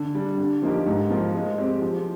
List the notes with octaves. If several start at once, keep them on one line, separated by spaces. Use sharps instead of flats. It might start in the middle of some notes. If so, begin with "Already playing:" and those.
Already playing: D3
G3 D4
D3
F3 A#3 D#4 G4
G#2
F3 A#3 F4
G#3
C4 G4
F3